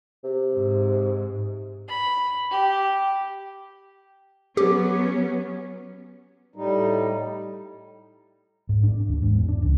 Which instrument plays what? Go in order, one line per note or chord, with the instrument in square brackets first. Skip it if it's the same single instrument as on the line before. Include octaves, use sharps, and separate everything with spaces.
[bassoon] C3
[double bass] G#2
[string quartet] B5
G4
[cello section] F#3 B3 C#4 [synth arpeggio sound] G4
[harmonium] A2 G3 D#4
[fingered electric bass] G#2
D4
D#2
G#2
E2
D4
C#2